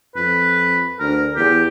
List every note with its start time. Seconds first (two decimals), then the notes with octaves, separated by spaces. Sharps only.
0.16 F2 B4
0.99 D2 A#4
1.36 E2 G4